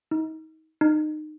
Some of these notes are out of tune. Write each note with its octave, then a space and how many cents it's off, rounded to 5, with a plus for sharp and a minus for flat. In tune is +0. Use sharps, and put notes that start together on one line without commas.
D#4 +30
D#4 -25